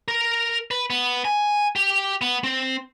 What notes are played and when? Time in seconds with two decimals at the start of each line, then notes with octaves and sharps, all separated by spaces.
0.08 A#4
0.71 B4
0.90 B3
1.25 G#5
1.76 G4
2.21 B3
2.44 C4